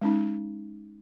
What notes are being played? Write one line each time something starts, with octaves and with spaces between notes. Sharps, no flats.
G#3 C#4 D#4